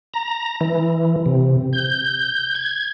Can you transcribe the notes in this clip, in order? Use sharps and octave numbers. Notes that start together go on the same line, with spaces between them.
A#5
E3
C3
G6
G#6